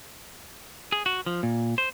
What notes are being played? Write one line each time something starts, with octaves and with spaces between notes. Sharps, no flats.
G#4
F#4
F3
A#2
C5